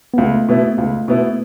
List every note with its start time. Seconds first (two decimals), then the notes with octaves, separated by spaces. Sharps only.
0.14 B3
0.18 C#2 A3
0.49 B2 B3 E4
0.78 C#2
1.08 B2 B3 E4